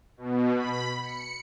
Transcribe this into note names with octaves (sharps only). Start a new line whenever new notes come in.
B2
B5
C#7